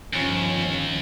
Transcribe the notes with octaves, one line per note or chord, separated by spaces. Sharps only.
G1 D#2 F3 C#4